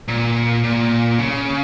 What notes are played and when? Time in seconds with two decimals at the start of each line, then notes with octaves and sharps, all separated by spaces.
0.08 A#2
0.64 A#2
1.19 C#3